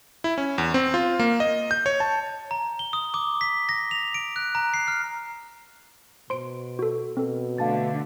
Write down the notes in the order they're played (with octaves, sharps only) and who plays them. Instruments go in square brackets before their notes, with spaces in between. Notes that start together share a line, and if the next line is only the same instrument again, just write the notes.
[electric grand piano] E4
C#4
E2
C4
F4
A#3
D#5
G6
C#5
A5
[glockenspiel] A#5
G7
D#6
D6
B6
A#6
F7
D7
F#6
A#5
C7
F6
[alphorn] B2 [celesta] C5 [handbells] C6 D7
[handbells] F#4 A4
[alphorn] B2 [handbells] C4 A4
[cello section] D3 A3 [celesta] F5 A5 A6